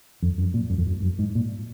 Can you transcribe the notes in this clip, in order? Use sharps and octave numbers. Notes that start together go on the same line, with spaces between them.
F2
F#2
A#2
F#2
F2
F#2
F#2
G#2
A#2